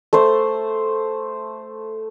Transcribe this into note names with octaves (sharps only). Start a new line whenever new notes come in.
A3 C5